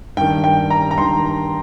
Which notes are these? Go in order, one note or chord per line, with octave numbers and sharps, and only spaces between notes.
G2 D#3 G5
G5
A#5
A#5
G2 D#3 C6